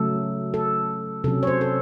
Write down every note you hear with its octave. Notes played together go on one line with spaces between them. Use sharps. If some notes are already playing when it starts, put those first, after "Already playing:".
Already playing: C#3 F#3 A3 A4
A4
C3 F#3 C#4 A4
C#5
C5
A4